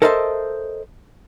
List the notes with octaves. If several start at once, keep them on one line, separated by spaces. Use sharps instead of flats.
A4 A#4 C5 D#5 E5 A5